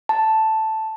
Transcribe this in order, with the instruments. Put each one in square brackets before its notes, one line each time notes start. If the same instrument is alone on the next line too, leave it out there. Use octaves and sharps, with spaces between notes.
[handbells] A5